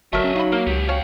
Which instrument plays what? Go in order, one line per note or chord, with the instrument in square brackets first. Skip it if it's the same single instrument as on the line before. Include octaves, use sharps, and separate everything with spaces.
[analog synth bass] G1 [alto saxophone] F#3 [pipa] A3 A#4 [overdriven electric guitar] D#5 E5
[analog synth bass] C#4
[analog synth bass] D#4 [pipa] F5 B5
[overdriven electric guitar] A#3 [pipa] A#4
[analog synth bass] C#2 [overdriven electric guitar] B3 G4
[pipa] C#4 F#4 [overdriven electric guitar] F5 G5